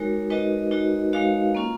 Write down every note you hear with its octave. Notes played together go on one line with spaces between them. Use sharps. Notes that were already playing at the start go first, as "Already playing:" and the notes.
Already playing: G#3 D#4 F#4 A#4 C#5
G#3 D#4 F#4 B4 D#5
G#3 D#4 F#4
G#3 D#4 F#4 C#5 F5
A#3 C#4 F4